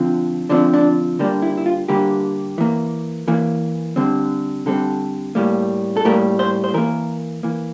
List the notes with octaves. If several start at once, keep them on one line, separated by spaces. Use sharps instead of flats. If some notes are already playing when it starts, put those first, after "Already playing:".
Already playing: D3 F3 C4
D3 F3 C4 D4
D4
D3 G3 A#3 D4
E4
E4
F4
D3 G3 A#3 G4
E3 A#3
E3 A#3
D3 G3 C4
D3 G3 C4 A4
A2 G3 A#3
A4
A2 G3 A#3 A#4
C5
C5
E3 A#3 A#4
E3 A#3